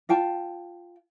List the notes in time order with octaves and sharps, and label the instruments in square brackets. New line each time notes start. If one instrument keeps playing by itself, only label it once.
[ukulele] F4 F5 G5 A5